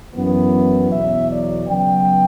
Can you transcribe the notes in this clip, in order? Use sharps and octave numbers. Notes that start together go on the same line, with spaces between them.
F#2 E3 B3
E2 B2 F#3 E5
D5
C#3 F#3 B3 G5